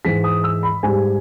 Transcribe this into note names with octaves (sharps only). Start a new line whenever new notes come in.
G#2 E3 G#3 B6
D#6
E6
B5
G#2 G3 G#5